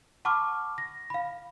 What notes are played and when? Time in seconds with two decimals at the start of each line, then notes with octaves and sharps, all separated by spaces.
0.25 F#5 A5 B5 C#6 D6 F6
0.78 A#6
1.10 F5 B5